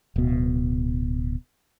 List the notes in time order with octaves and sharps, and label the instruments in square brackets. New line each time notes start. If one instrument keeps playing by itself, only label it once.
[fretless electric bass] D1 B2